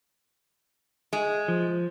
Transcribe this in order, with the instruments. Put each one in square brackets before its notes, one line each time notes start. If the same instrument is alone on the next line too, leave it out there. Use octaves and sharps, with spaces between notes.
[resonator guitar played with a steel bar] G#3
[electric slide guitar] F3